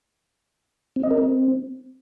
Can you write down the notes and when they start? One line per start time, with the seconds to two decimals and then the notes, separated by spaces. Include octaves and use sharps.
0.96 C4
1.03 D#5
1.11 A#4
1.18 C4